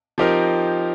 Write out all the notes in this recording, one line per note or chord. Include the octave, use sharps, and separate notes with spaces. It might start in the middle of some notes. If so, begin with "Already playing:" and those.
F3 C4 D#4 G4 A#4